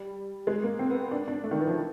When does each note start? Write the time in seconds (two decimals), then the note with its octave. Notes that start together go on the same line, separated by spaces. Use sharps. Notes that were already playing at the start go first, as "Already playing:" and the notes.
Already playing: G3
0.47 G#3
0.64 A#3
0.79 C4
0.90 B3
1.11 D4
1.28 D4
1.44 A3
1.51 D#3
1.60 E3
1.67 F3